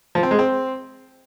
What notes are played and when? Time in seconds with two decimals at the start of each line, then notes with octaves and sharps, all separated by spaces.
0.15 F3
0.23 C4
0.31 G#3
0.39 C4